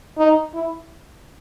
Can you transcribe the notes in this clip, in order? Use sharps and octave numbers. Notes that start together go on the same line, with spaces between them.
D#4
E4